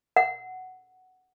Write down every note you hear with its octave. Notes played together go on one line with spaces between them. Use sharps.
F#5